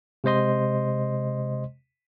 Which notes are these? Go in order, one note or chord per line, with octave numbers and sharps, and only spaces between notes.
C3 G#3 C5 D#5 C6